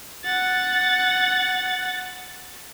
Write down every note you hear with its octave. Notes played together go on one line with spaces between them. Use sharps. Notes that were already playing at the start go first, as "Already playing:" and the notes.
F#5 A6